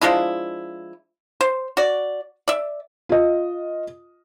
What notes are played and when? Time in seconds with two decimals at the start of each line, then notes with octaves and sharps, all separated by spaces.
0.01 F3 G#3 D4 E4
1.41 C5
1.77 F#4 D5
2.48 D5 E5
3.09 F4 D#5